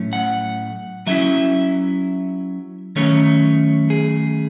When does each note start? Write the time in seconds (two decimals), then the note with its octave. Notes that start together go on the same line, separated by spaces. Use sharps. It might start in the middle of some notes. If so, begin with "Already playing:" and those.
Already playing: A2 F#3 A3 C#4
0.13 F#5
1.07 F#3 C#4 E4 E5
2.96 D#3 F#3 A3 C#4 C#5
3.90 G#4